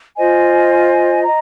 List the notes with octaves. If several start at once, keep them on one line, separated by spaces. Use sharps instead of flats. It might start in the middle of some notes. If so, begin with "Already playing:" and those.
F4 C5 D#5 G#5
D#5 A#5